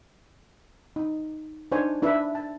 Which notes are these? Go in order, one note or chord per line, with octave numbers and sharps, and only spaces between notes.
D#4
D4 D#4 C5 C#5 G#5
D4 E4 B4 E5
A5